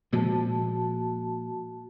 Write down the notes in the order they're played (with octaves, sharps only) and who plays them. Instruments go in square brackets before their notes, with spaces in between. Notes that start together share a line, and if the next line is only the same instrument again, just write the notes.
[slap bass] A#2 F3 G#3 [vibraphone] F#4 A5